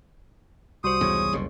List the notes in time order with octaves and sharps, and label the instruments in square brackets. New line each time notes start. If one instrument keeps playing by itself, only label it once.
[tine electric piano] C2 G3 C6 [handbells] F#4 C5 [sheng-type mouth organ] D#6
[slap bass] E2 G#2 C#3 [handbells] G#4 C#5 C#6
[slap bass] F#1 F2 B2